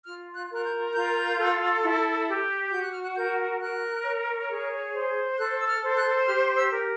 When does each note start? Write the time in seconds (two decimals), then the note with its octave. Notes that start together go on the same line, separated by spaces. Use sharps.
0.05 F4 F6
0.34 F#6
0.50 A#4 F#6
0.64 G6
0.93 F4 G6
1.38 A4
1.82 E4
2.27 G4
2.71 F#4 G6
2.82 F#6
2.92 F6
3.03 F#6
3.15 A#4 G6
3.60 A#4 F#6
4.05 C#5
4.49 G#4
4.93 C5
5.38 A4 F#6
5.59 E6
5.67 F6
5.82 C5
5.96 F#6
6.26 G4 F6
6.56 E6
6.71 A#4